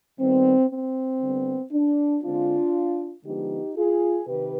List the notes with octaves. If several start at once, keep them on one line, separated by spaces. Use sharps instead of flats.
D#3 G3 B3 C4
C4
D3 G3 B3
D4
D3 G#3 C4 D4 F4
D3 F3 G#3 B3 D#4 G4
F4 G#4
C3 D#3 G4 B4